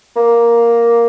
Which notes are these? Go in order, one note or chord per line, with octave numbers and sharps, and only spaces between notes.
A#3